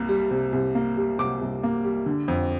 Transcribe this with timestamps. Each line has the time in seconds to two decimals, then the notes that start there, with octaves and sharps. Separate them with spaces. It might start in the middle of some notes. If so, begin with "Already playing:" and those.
Already playing: C2 C3 A#3
0.09 G3
0.31 C3
0.53 C2
0.75 A#3
0.97 G3
1.18 C3 D6
1.41 C2
1.63 A#3
1.84 G3
2.06 D3
2.28 F2